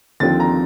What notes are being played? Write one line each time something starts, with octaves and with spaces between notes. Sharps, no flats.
D#2 D3 F3 C4 A6
A#5